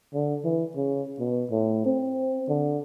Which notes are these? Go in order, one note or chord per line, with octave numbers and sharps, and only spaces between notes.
D3
E3
C#3
B2
A2
C4
D3